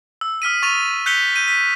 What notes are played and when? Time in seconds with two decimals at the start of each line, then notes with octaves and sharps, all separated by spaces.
0.21 E6
0.42 D#6 F6 B6 D#7
0.63 C#6 A6 D#7 F7
1.06 F#6 G6 B6 C#7 F7 G7
1.36 G6 D#7
1.48 B6